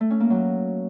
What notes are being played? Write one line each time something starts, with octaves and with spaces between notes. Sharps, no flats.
A3
C#4
A#3
F#3